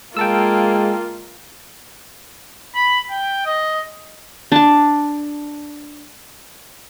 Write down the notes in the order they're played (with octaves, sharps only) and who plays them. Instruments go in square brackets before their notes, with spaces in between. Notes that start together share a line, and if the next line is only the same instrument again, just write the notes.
[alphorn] G#3 [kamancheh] A#3 [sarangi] F4 [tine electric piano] G5 A5 E6
[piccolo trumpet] B5
G5
D#5
[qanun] D4 A5